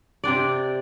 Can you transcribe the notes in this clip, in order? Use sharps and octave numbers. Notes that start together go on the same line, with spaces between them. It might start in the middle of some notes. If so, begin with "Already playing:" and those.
C3 C4 D4 D5